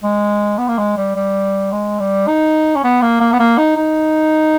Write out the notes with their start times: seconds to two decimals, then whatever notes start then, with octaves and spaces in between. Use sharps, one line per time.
0.03 G#3
0.58 B3
0.68 A#3
0.78 G#3
0.97 G3
1.16 G3
1.72 G#3
1.99 G3
2.27 D#4
2.76 C#4
2.83 B3
3.02 A#3
3.20 A#3
3.32 B3
3.39 A#3
3.58 D#4
3.76 D#4